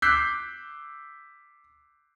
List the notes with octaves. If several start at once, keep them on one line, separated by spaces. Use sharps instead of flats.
D6 E6 F#6 G6 B6 C7